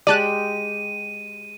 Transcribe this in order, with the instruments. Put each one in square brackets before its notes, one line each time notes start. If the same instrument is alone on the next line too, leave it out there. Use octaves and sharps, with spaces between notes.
[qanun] G#3 G4 [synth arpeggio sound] D5 A5 F#6 [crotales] D#7